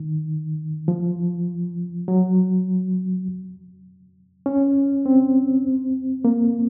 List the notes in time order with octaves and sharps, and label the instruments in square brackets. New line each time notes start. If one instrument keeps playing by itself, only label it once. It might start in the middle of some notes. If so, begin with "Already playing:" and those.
Already playing: [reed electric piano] D#3
F3
F#3
C#4
C4
A#3